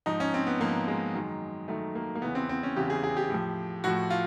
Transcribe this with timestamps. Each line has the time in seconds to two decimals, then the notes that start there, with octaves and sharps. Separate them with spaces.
0.06 G#2 F3 D#4
0.20 C#4
0.34 C4
0.47 B3
0.61 G#2 F3 A#3
0.87 G#3
1.14 F#2 D#3
1.68 F#2 D#3 A3
1.95 A#3
2.15 A#3
2.22 E2 C#3 E3 B3
2.35 C4
2.49 C4
2.63 C#4
2.76 E2 C#3 E3 G4
2.90 G#4
3.03 G#4
3.17 G4
3.30 A2 F3
3.84 A2 F3 F#4
4.10 F4